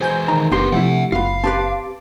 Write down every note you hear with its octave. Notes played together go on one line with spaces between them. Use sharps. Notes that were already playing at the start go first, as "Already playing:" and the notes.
E3 F#4 G#4 C5 G#5 G6
D#3 A#5
F#1 B3 D4 G4 A#4 B4 C6
C3 F3 A3 E4 E5 F#5
F#1 B3 F4 F5
C4 G4 B4 A5 D6